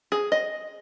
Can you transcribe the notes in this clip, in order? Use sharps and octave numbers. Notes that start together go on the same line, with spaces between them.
G#4
D#5